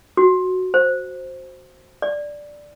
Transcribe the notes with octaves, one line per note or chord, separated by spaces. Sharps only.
F#4
C5
D5